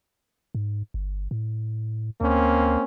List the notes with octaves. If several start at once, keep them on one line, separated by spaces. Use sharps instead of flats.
G#2
G1
A2
D2 A#3 C4 C#4